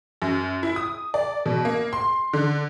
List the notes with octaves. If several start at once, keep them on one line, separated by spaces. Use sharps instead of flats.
F#2
E4
D#6
D5
B2
A#3
C6
D3